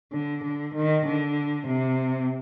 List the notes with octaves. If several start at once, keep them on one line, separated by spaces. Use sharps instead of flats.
D3
D3
D#3
D3
C3